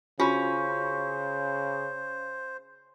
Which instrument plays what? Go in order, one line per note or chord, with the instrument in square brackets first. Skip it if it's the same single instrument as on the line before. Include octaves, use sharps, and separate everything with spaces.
[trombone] C#3 [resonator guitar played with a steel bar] C#4 [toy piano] F4 F#4 B5 [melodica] C5